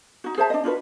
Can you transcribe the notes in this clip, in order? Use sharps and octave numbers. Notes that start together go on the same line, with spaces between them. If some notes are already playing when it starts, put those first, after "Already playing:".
D#4 F#4
G#4 C5 E5 A5
D4 D#5
D4 F4 F#4 B4